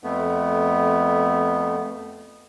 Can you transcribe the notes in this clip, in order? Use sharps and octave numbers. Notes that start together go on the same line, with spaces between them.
F2 A3 B3